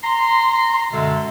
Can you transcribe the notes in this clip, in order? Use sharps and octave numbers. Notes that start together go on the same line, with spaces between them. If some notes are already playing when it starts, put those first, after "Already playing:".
A#5 C6
F#2 B2 D3 G#3 A4 E5